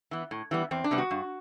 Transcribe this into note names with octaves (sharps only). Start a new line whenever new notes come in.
E3 B3
A2
E3 G3 B3
E2 C4
D4
C3 G3 B3
F#4
G2